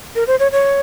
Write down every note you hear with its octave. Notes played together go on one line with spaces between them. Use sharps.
A#4
C5
C#5
C#5